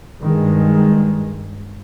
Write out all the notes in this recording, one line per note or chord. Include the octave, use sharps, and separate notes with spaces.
G2 D#3 G#3